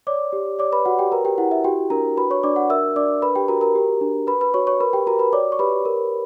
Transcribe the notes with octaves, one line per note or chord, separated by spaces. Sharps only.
C#5 D5 D6
G4
C#5 D5 D6
B4 B5
F#4 F#5
G4 G5
A#4 B4 A#5
G4 G5
E4 F#5
E5
F#4 G4 G5
D4 A#4 A#5
F#4 B4 B5
C#5 C#6
D4 D5 D6
F#5
A#4 E5 E6
D4 D5 D6
B4 B5
G4 G5
F#4 A#4 A#5
A#4 A#5
G4
D4
B4 B5
B4 B5
F#4 C#5 C#6
C#5 C#6
A#4 B4 B5
G4 G5
F#4 A#4 A#5
B4 B5
C#5 D5 D6
C#6
G4 B4 B5
A#4